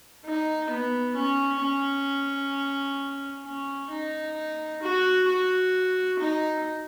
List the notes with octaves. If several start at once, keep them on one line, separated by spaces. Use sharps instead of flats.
D#4
B3
C#4
C#4
C#4
D#4
F#4
F#4
D#4